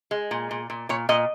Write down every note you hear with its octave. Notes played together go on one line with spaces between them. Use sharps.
G#3
A#2
A#2
A#2
A#2 C#5
A#2 D#5